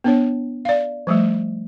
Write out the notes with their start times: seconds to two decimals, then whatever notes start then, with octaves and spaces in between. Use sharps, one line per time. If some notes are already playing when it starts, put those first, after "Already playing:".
0.04 B3 D4 C#5
0.65 D5 F5
1.07 F3 G3 A3